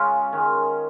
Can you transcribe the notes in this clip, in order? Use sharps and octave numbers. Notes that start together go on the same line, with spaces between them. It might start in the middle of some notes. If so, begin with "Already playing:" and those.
Already playing: C#3 G#3 C#4 F4
D#3 G#3 C#4